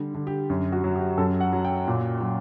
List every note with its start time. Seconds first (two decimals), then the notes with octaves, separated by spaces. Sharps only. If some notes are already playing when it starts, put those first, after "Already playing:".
Already playing: D3 G3
0.14 D3
0.27 G4
0.50 F#2
0.72 F#4
0.84 F#3
0.95 G4
1.18 F#2 A4
1.41 F#5
1.53 F#3
1.65 G5
1.87 A#2
2.21 F#3